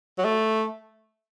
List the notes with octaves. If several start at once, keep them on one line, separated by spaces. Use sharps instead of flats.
F#3
A3